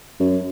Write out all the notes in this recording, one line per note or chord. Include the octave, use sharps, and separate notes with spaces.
F#2